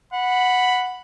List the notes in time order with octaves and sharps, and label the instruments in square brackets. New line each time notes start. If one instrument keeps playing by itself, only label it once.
[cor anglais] F#5 [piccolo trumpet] B5